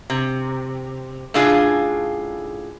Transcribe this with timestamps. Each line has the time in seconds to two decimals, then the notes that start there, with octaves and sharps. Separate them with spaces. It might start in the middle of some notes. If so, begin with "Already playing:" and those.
0.10 C3
1.34 A2 C#3 D4 F4 G#4